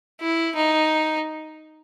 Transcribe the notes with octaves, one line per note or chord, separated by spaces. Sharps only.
E4
D#4